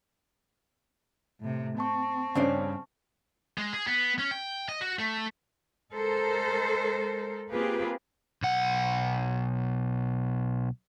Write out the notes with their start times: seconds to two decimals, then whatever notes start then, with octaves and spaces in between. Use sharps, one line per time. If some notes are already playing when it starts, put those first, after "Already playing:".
1.40 A2 C3
1.78 C4 A5 C#6
2.35 G2 C#3 C#4 D4 C5
3.58 G#3
3.73 G#4
3.87 B3
4.19 C#4
4.31 G5
4.69 D#5
4.81 F#4
4.99 A3
5.91 G#3 A4 A#4 C5
7.52 A#3 C4 F4 G4 G#4 B4
8.42 B1 F#5